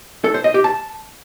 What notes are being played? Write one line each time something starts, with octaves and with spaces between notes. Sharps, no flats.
A4
C5
D#5
G4
A5